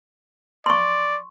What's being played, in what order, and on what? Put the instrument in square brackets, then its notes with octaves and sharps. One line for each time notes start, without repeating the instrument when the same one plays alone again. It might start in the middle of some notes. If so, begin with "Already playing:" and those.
[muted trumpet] D5 [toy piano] C6 C#6